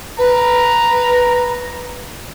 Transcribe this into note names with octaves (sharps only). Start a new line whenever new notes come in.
B4 A#5